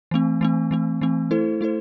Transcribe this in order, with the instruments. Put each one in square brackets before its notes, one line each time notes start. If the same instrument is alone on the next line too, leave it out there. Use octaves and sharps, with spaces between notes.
[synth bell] E3 A3 C4
E3 A3 C4
E3 A3 C4
E3 A3 C4
A3 E4 A4 C5
A3 E4 A4 C5